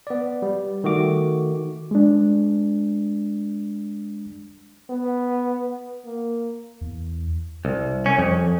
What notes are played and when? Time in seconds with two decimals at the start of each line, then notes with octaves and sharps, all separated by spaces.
0.07 B3 D5
0.42 G3
0.84 D#3 A3 F#4 D6
1.91 G#3 D4
4.90 B3
6.06 A#3
6.81 E2
7.65 C2
8.06 C#4
8.19 F2